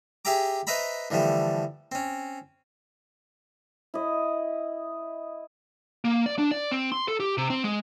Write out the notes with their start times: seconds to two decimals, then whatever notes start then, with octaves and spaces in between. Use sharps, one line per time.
0.25 G4 G#4 E5 G5 A#5 D6
0.67 B4 C5 D#5 E5 A#5 B5
1.11 D3 E3 F3 G3 A3
1.92 C4 C#4
3.94 E4 D#5
6.05 A#3
6.26 D5
6.38 D4
6.51 D5
6.71 C4
6.92 C6
7.08 A4
7.20 G4
7.37 C3
7.50 C4
7.64 G#3